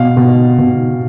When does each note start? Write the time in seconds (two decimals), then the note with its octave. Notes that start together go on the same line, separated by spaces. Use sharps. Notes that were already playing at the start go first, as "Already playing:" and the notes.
Already playing: B2 F5
0.17 B2
0.59 B2